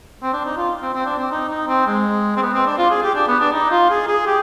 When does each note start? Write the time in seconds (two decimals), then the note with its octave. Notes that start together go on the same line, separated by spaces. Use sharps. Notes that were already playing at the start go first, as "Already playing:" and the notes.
0.23 C4
0.34 D4
0.45 D#4
0.57 F4
0.82 C4
0.94 C4
1.06 D4
1.19 C4
1.31 D#4
1.49 D#4
1.68 C4
1.87 G#3
2.37 C4
2.42 B3
2.54 C4
2.66 D4
2.78 F4
2.90 G#4
3.03 G4
3.15 D4
3.28 B3
3.40 D4
3.53 D#4
3.71 F4
3.90 G#4
4.08 G#4
4.27 G4